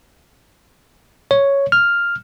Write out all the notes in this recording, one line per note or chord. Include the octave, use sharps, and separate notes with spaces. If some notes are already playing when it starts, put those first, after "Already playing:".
C#5
F6